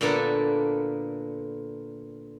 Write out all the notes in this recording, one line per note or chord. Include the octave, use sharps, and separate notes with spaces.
A#2 D3 A#3 B3 A4